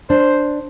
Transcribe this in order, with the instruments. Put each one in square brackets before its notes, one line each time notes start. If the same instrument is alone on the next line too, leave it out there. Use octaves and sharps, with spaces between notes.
[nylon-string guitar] D4 [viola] C5